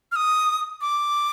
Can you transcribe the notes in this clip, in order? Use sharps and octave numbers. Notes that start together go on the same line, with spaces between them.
F6
D#6
D6